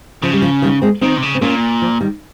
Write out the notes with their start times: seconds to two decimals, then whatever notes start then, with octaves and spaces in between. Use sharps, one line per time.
0.23 C#3 F3
0.33 G3
0.42 F3
0.62 D#3 G3
0.82 G#3 C4
1.01 D#3 C4 D#4
1.17 C3
1.22 C#3
1.35 C4
1.41 A#2 A#3 C#4
1.82 F3
2.01 D#3 G3